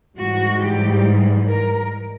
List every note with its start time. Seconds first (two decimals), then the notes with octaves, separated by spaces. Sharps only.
0.17 G#2 E3 G3 F#4
0.60 G4
1.47 A#4